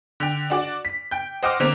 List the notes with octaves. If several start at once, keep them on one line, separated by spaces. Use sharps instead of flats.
D3 G5
D4 F#4 D5
B6
G5 G6
C5 D#5 F#5 G5 D6 F6
D3 A#3 C4